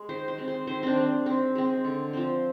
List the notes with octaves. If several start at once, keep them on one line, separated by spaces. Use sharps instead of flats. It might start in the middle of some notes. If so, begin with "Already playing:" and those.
Already playing: G#3
D#3 C5
C5
G#3 C4
C5
D#3 C5
C4 D4
G#3 C4
D#3 C4
G#3 C4
D3
F3 C4